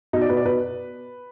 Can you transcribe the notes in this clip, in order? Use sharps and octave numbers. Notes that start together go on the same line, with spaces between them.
B2 D#4
D5
B2 B4
D5
B2 B4